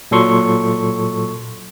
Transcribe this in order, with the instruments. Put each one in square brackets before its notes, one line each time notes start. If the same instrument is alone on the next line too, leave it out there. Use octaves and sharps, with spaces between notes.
[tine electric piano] A#2 F#3 A4 C6 C#6